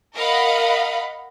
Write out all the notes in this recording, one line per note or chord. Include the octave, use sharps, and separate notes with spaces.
A#4 D#5 F5 F#5 B5